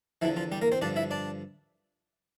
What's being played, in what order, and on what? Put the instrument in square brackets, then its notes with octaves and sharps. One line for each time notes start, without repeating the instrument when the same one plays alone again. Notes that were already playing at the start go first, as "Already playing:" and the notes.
[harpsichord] E2 D3 E3 F3 E4
F3 F4
G3 G4
A#3 A#4
C4 C5
G2 D3 F3 D4 D5
E4 E5
D4 D5